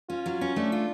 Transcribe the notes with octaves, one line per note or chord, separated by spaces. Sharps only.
C#4 F4
F#3
C#4
A3 D4
F4